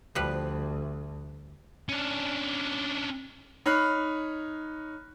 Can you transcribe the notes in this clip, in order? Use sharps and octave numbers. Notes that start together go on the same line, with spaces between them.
D2 F3 G3 B4
C#4 D4
D#4 C#5 B5 F6 F#6 C7